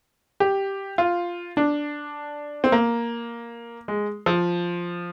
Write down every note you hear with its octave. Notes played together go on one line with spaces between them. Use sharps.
G4
F4
D4
C4
A#3
G#3
F3